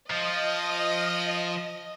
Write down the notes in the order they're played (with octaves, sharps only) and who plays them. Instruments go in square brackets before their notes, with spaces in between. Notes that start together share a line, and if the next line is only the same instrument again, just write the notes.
[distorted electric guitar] F3 [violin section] D#5